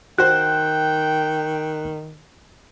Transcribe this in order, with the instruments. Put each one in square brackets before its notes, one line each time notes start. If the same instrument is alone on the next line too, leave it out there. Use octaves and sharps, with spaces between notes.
[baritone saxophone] D#3 [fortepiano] F#4 C5 [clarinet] G5 [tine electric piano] F#6